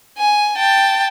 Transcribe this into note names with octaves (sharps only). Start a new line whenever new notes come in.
G#5
G5 A5